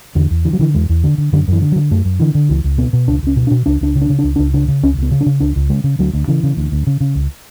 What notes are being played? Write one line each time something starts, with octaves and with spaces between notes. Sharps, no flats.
E2 D3
E2
D3 E3
F#3
D3 E3
E2 G#3
E2
D3
D3
F#2 D3
F#2 E3
D3
F#3
D3
F#2 A3
F#2
D3 E3
D3
C#2 E3
C#2
B2 B3
B2
C#2 D4
C#2 C#4
B2
D4
B2
C#2 D4
C#2 D4
C#3
D4
C#3
D4
C#2
C#2 D4
C#3 D4
C#3
C#2 C#4
C#2
B3
C#3
D4
C#3
C#2 D4
C#2
C#3 G#3
C#3
D2 F#3
D2
C#3 E3
C#3
D2
D2
C#3
C#3
C#2